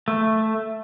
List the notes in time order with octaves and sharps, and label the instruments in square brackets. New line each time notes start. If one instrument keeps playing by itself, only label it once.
[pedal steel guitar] A3